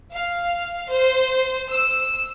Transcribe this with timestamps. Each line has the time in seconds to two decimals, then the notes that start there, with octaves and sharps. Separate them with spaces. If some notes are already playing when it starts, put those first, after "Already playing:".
0.12 F5
0.90 C5
1.71 E6